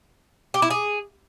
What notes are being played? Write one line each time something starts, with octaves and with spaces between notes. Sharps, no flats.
G4
E4
G#4